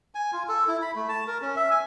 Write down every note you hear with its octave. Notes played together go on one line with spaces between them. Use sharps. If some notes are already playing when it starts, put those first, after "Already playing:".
G#5
F4
A4
E4
B5
A3
A5
A#4
C#4
E5
G#5